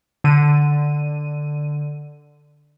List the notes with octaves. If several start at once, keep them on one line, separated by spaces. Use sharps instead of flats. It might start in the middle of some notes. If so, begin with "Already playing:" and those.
D3 D#7